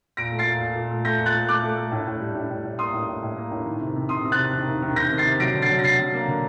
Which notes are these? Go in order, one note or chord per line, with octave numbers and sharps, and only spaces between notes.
A#2 A#6 D7
A3
A6 C7
A#2
A#2
A#2
A3
A3 G6 A#6
A#2
F#6 A6
A3
A3 D6 F#6
A3
A3
A2
A2
G3
A2
A2
A2
A#3 C6 D#6
A2
A2
A2
A#3
A2
D#3
C3
C3
C3 C6 D#6
C3
F#6 A6
C3
D#3
D#3
D#3
D#3 G6 A#6
C3
A6 C7
C3
F#3 A#6 D7
D3
A6 C7
F#3
A#6
D3 A6 C7
F#3
A#3
D3